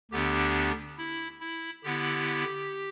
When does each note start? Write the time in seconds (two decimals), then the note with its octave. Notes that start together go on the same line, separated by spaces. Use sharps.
0.11 D2 D3 B3 D4 G4
0.98 E4
1.40 E4
1.84 D3 B3 E4 G4